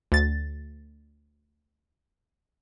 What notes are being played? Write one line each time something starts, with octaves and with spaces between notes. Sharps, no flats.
D2 A6